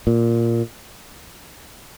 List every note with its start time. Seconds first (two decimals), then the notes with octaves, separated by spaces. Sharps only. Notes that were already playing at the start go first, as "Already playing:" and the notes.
0.07 A#2